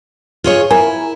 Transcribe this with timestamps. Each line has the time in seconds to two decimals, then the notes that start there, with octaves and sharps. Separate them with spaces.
0.44 F4 G#4 C#5
0.71 E4 A#4 G#5